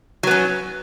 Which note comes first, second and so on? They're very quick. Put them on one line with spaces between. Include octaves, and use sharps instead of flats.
F#3 B3 C#4